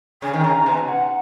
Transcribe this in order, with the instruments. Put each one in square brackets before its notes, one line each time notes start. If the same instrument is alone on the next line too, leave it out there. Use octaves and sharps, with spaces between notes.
[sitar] C#3 [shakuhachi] G#5
[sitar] D#3
[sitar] C#3 [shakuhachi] A#5
[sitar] B2 [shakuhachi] G#5
[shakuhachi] F#5